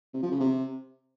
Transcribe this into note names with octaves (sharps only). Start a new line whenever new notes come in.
C3
F3
C#3
C3